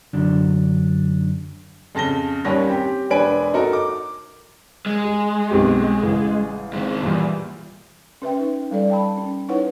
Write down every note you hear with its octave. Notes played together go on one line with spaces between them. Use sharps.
F#2 D3 F#3 D4
F2 C#3 A5 A#6 G7
D#2 D#3 G3 C#4 A#6
C4 G4
E1 D4 B4 G#5 D7
D#4 F#4 A4 A#4
D6
G#3
G#4
B1 C4 G4
A1 C#3
G#2 D#3
E2 A#2 G3
C#4 B4 E5 G5
D#4
G3 A4 D5
G5 A5 B5
C#4
D#4 E4 B4 C#5 F#5